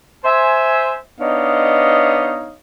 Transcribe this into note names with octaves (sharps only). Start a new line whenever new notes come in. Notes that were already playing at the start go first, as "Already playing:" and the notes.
C5 E5 G#5
B3 D4 D#4 C#5 D#5 F5